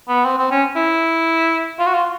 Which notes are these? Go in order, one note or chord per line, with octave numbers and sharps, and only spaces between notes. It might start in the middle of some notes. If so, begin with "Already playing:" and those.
B3
C4
C4
C#4
E4
F4
F#4
F4